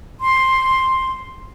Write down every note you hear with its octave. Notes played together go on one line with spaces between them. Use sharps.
C6